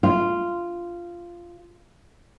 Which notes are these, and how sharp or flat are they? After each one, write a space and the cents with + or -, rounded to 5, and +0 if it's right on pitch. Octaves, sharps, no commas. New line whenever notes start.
F4 -10